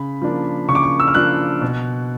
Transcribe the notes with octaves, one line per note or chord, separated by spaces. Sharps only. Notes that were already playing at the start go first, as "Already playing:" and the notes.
Already playing: C#3 B5
F3 A#3 D4
C#3 C#6
D6
C#6
E6
F6
F3 A#3 D4 F#6
B2